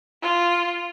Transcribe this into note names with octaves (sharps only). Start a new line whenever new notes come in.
F4